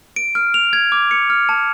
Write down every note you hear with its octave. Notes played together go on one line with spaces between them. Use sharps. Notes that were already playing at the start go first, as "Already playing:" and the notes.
D7
F6
F7
G#6
D6
C#7
F6
A5